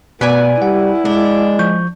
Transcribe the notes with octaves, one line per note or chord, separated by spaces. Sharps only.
B2 B3 B4 D5 G#5
G3 E4 F#5
G#3 D4
F3 C#6 G6